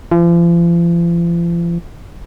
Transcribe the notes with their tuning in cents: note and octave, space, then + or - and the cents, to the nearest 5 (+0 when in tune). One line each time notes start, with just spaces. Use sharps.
F3 -40